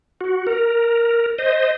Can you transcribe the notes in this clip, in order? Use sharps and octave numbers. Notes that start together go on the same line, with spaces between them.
F#4
A#4
C5 D#5